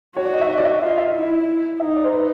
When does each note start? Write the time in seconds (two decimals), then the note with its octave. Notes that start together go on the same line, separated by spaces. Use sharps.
0.16 F#4 C#5
0.25 D5
0.33 D#5
0.41 E5
0.49 D#5
0.58 D5
0.65 E5
0.74 D#5
0.82 F4 E5
0.90 D#5
0.98 E5
1.07 D#5
1.15 E4
1.80 D#4 E5
1.88 D#5
1.96 D5
2.04 C5
2.13 B4